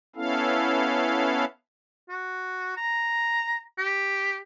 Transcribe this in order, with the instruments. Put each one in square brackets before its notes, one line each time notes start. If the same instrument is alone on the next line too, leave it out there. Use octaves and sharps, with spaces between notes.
[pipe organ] B3 C#4 E4 A4 F5
[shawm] F#4
A#5
G4